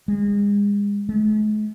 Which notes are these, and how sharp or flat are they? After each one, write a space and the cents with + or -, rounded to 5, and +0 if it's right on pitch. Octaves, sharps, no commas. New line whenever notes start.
G#3 -35
G#3 +45